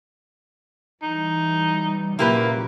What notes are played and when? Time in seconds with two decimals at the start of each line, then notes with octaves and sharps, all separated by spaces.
1.02 E3 G3 D#4
2.19 A#2 C#3 F#3 A#3 E4 G4 B4